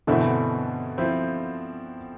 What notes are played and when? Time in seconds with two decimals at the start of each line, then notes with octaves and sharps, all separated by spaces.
0.07 G2 B2 D3 E3 A3 C4 E4
0.98 F3 C4 E4